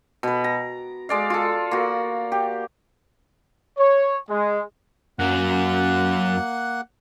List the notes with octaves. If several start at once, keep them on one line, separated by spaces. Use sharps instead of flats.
B2 B4
A#5
G#3 D5 F5
F4 A4
A#3 F#4
G4
C#5
G#3
F#2 F#3 A#3 F#5 F#6